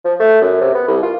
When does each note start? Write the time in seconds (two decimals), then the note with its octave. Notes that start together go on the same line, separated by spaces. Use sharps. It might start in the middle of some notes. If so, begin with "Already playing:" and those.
0.04 F3
0.20 A3
0.41 F#2
0.61 C3
0.74 B3
0.88 C2
1.03 F4